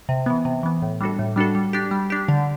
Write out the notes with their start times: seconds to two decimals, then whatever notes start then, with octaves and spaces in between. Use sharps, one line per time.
0.09 C3
0.26 E3 B3
0.45 C3
0.63 E3 B3
0.82 A2
1.01 G3 D4 F#4 A4
1.19 A2
1.36 G3 D4 F#4 A4
1.55 G3
1.73 D4 G4
1.91 G3
2.10 D4 G4
2.28 D3